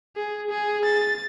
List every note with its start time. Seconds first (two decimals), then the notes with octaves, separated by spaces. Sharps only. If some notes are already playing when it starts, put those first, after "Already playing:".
0.16 G#4
0.50 G#4
0.85 A6